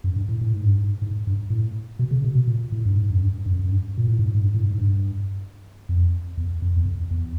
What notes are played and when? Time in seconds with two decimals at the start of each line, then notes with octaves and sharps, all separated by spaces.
0.04 F#2
0.16 G2
0.29 A2
0.41 A2
0.52 G#2
0.65 G2
0.77 G#2
1.02 G#2
1.27 G2
1.50 A2
1.99 B2
2.11 C#3
2.24 B2
2.35 B2
2.47 A#2
2.72 A2
2.85 G2
2.97 G#2
3.11 F#2
3.21 G2
3.46 F#2
3.59 F#2
3.70 G2
3.97 A#2
4.08 A2
4.19 G#2
4.35 G#2
4.42 G2
4.54 A2
4.63 G2
4.68 G#2
4.78 G2
5.89 F2
6.37 E2
6.62 F2
6.77 E2
6.86 F2
7.11 E2